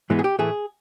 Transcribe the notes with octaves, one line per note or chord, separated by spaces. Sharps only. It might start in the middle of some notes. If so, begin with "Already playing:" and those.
G#2 E3 G#3 B3
G#4
G4
A2 E3 A3 G#4